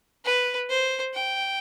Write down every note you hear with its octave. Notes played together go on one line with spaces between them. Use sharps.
B4
C5
G5